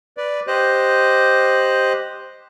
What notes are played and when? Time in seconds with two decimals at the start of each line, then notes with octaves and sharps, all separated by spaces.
0.17 B4 D5
0.47 G4 C5 D#5 F#6